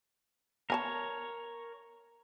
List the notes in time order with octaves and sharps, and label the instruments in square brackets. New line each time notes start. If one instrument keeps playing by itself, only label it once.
[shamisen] B3 G#5 A5 [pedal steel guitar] A#4 C#5